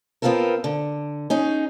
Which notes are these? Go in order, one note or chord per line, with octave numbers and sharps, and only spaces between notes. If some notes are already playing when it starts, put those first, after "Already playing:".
B3 C4 D#4 F4 A4 A#4
D3
C#4 D#4 G#4